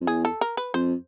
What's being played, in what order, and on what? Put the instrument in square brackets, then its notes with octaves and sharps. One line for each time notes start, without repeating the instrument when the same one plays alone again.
[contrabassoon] F2
[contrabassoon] E2 [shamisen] G#4
[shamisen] A4
A#4
B4
[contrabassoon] F2 [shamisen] C5